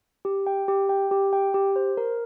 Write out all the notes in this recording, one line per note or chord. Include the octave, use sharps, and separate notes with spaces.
G4
G5
G4
G5
G4
G5
G4
C5
A#4